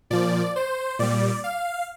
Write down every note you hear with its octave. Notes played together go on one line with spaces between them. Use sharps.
A#2 F3 D5
C5
A#2 G3 D5
F5